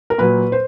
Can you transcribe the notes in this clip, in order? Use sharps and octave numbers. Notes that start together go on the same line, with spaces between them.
A#4
A#2 F#3 B4
C5